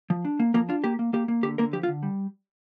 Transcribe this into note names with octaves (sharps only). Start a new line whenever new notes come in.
F3
D4
A#3
F3 A#3 A#4
D4 F4
A#3 G4
A#3
A#3 G4
A#3
D3 G4
D3 A#3 A#4
F3 G4
F4
D3
G3